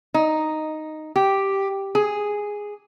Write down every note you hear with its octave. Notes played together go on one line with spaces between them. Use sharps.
D#4
G4
G#4